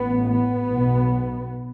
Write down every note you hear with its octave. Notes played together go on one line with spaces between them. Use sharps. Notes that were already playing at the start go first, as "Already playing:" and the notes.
Already playing: A1 A2 B3
B3
B1 B2